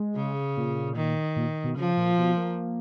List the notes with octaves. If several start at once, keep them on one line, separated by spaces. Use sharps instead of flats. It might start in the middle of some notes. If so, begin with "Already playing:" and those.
Already playing: G#3
C#3
A#2
D#3
A#2
B2
C#3 F3
A#2
B2
A#3